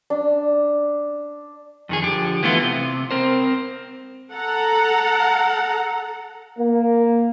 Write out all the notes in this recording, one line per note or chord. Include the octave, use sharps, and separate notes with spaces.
D4
F2 D#3 G#4
D3 F3 G4
E3 A3 B3 F4
C3
C4 A#4 C5
A4 F#5 A#5
A#3